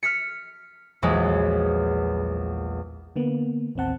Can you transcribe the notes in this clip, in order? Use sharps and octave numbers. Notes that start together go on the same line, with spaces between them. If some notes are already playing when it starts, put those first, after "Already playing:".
F6 B6 C#7
A#1 E2 F#3 G#3
D3 A#3 B3
A1 D#2 C4 F#5 A5